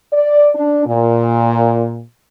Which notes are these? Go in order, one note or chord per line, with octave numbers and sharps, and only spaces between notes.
D5
D4
A#2